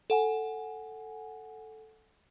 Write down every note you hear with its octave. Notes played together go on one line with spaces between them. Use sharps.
A4 F#5 G#5